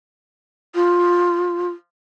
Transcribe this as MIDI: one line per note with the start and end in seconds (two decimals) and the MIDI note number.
0.75 1.68 65